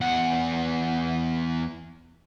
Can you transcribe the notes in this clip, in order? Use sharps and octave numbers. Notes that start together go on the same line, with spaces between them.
E2 F#5